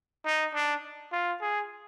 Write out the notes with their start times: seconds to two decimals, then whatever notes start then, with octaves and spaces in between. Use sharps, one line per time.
0.25 D#4
0.54 D4
1.12 F4
1.41 G#4